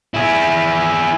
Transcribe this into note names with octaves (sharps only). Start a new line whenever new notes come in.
E4 G#4